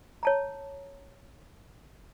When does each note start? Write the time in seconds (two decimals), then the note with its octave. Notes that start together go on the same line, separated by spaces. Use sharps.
0.23 C#5 A5 A#5